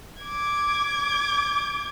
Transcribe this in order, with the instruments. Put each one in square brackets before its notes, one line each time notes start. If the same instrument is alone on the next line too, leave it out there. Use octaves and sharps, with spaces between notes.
[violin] D6 G#6